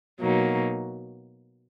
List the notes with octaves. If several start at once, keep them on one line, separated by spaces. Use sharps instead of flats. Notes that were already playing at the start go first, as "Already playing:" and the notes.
B2 F#3 A#3 D#4